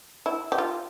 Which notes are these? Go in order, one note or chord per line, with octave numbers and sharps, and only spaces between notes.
E4
G4
F4